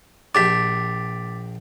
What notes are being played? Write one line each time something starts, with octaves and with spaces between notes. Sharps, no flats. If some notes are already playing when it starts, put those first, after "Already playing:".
A#1 G4 A5 D6 A6 B6